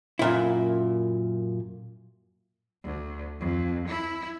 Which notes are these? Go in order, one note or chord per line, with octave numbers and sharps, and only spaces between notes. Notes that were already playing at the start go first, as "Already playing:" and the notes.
F#2 A#2 E4
D2
F2
E4